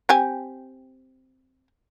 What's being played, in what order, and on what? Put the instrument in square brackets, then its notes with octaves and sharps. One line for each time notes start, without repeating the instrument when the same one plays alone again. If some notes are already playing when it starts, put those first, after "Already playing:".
[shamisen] C4 G4 G#5